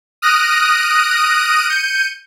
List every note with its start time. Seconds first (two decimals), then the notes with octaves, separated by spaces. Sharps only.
0.22 D#6 F6 F#6 A#6 D7 D#7
1.69 G6 C#7 D#7